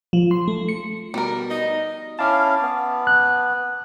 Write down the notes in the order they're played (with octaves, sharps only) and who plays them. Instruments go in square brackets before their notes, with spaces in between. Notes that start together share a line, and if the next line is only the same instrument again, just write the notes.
[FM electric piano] F3
C6
A3
C#7
[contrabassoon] B2 [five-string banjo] G3 A#4
[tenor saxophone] D#4 [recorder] D#5
[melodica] C#4 E4 F5 [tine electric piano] A5 D6 F6
[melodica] B3
[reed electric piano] F#6